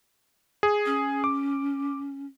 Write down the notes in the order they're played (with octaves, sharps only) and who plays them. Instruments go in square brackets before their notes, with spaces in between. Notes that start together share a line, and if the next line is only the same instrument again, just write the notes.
[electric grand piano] G#4
[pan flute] C#4
[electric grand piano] D6